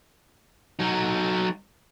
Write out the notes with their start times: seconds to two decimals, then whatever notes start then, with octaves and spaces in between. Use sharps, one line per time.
0.79 F#3 D#4